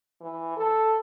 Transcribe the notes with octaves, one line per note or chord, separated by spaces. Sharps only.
E3
A4